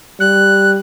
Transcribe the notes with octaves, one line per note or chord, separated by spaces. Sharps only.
G3 F#6